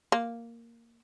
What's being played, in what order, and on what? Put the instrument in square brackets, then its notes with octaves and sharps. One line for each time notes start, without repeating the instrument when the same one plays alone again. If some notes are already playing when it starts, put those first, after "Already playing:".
[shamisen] A#3